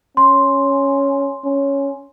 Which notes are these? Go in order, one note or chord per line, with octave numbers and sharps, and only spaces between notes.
C#4 C6
C#4